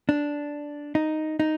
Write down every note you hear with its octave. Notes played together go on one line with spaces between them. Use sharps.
D4
D#4
D#4